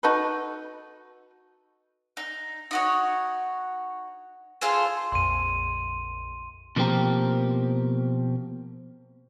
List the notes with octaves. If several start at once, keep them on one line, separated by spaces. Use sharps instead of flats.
D#4 F#4 A4 B4
D#4
D#4 F#4 C#5
F4 G#4 A4 C5
A#1 F2 C6 D#7
B2 F3 A#3 C4 G4 A#4